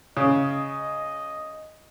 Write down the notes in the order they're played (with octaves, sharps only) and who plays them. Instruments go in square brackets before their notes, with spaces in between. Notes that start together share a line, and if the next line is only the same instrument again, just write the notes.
[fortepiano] C#3 [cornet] D#5